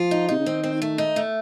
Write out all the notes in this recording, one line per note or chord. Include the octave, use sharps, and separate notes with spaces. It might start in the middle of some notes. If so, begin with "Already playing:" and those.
Already playing: F3 F4
D#4
C3 D#4
C#3
D#3 C4
C4
A3
D#4
A3